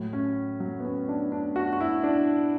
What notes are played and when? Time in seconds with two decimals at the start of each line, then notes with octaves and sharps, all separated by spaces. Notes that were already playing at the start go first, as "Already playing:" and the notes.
Already playing: A2 F#3
0.13 C#4
0.60 F#3
0.80 B3
0.85 C#4
1.09 D4
1.32 D4
1.56 F#4
1.73 F#4
1.81 E4
2.04 D4